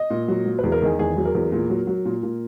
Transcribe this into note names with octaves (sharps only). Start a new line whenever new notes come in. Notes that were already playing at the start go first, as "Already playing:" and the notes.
Already playing: D#5
A#2
F#3
F#3
E2 B4
A#4
D#3 G#4
E2 G#4
F#3
A#4
E2
A#2
F#3
F#3
A#2
A#2